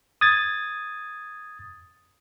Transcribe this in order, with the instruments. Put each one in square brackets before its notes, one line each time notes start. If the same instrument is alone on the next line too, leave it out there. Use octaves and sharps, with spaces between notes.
[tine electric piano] D#6 G#6 A6